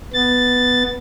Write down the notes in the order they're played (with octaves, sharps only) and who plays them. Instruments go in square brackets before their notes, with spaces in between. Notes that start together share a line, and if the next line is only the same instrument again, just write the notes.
[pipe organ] B3 A6